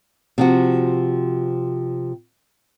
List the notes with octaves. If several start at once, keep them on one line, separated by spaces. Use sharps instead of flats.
C3 F3 F#4